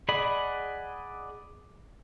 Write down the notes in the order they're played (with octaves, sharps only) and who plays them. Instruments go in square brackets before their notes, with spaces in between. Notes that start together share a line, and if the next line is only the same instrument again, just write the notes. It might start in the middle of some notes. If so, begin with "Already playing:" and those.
[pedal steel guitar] G#4 D5 D#5 F#5 B5